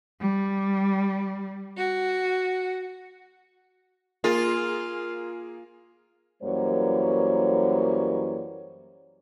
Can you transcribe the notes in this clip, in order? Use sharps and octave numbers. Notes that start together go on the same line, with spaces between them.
G3
F#4
A#3 F4 G#4
F#2 E3 G3 A#3 C5 C#5